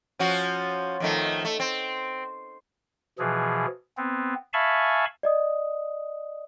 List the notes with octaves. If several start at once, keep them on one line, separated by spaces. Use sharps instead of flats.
F3 C#4 F#4
F2 D#3 A3
A3
C4
B2 E3 F3 G#4
B3 C4
E5 F5 G#5 A5 B5 C#6
D5 D#5 D#6